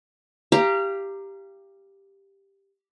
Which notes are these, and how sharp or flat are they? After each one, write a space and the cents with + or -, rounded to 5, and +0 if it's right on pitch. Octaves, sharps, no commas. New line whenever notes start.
G4 +5 F5 -25 A#5 +0